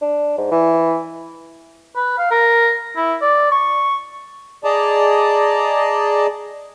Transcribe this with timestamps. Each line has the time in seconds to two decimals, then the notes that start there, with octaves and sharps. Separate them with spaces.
0.02 D4
0.38 G#2
0.51 E3
1.96 B4
2.18 F5
2.31 A#4
2.96 E4
3.21 D5
3.52 C#6
4.64 G#4 D5 D#5 A5 A#5